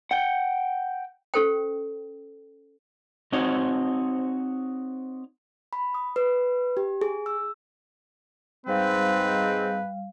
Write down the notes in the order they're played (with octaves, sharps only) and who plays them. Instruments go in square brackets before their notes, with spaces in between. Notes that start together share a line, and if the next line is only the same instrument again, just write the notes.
[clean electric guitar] F#5 G5
[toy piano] C#4 G4 A4 C5 G5
[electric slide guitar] C4 D#4 F#4 C5 C#5
[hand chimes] B5
D#6
B4
G4
G#4
E6
[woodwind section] G#2 C4 [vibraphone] G3 F5 [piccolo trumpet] B4